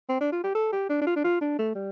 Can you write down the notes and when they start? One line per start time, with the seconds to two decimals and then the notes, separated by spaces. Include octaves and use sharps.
0.09 C4
0.21 D4
0.32 F4
0.44 G4
0.55 A4
0.72 G4
0.89 D4
1.01 D4
1.07 F4
1.16 D4
1.24 F4
1.41 D4
1.59 A3
1.75 G3